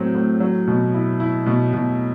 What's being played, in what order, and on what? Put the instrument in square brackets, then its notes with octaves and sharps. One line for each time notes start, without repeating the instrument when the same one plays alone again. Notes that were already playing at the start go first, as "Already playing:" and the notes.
Already playing: [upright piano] A2 F#3 C4
A2
F#3
B2
E4
E4
B2
B2